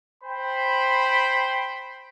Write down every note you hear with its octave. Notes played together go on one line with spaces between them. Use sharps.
C5 G5 B5